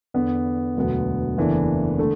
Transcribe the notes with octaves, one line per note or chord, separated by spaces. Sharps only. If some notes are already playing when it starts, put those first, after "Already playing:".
E2 D3 B3
E1 D2 D3 F#3 B3
F#1 E2 E3 A3 D4
D3 A3